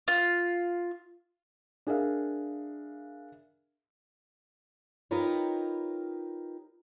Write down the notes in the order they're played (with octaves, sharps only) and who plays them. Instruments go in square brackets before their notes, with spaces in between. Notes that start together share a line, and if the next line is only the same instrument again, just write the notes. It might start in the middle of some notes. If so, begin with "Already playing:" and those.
[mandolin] F4
[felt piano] D4 G#4 A#4 E5 F5
[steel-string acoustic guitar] D#4 F4 G4 A#4 B4 C#5